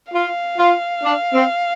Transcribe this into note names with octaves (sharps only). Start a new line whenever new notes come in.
F4 F5
F4
D4
C4